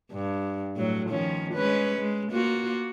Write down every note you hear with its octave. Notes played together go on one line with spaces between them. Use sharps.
G2
A2 F#3
D#3 F3 C#4
G#3 C#4 B4
G#3
A#3 F4 F#4